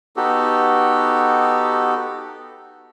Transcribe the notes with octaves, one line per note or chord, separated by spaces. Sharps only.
B3 D#4 F#4 G4 A4